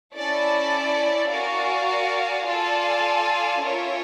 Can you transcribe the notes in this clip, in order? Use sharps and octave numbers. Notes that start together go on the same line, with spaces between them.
C#4 E4 A4 D5
F#4 A#4 D5 F5 G#5
F4 A4 D5 F5 G#5
C#4 F4 A#4 C#5 E5